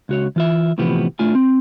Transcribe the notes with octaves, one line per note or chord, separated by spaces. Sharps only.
C#2 F#4 C#5
E3 F4 E5
A2 C3 E3 F3 B3 G4
A2 A3 D4 F4 G#5
C4